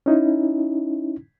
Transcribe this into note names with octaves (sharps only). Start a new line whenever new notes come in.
C#4 D#4 E4